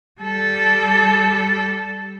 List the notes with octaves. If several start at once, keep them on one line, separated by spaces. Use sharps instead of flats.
G3 A4